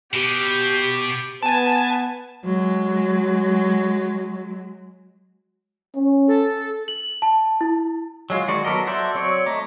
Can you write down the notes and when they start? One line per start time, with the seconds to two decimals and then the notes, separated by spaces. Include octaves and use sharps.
0.13 B2 G4
1.43 B3 B4 G#5 A5
2.44 F#3 G#3
5.96 C#4
6.28 A4
6.88 F#7
7.22 A5
7.61 E4
8.30 F#3 G#3 F4
8.48 D#3 G#3 F#4 D5
8.64 F#3 B3 A4 A#4 D#5
8.87 F#4 A4 C5 D5 E5
9.15 F#3 C4 C#5 D5
9.46 A3 D#5 A#5 D6